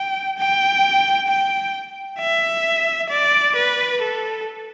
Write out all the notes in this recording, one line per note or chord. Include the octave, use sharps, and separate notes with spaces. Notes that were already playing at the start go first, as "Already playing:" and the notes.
Already playing: G5
G5
G5
E5
D5
B4
A4